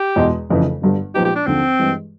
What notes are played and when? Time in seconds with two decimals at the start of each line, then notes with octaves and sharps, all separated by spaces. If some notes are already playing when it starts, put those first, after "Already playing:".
Already playing: G4
0.16 E2 B2 G#3
0.50 F1 F2 C#3 E3
0.82 G1 G2 D3 G3
1.14 A#2 F3 G#3 B3 D#4 G4
1.25 G4
1.35 D4
1.46 D#2 D3 F3 C4
1.79 G2 E3 G#3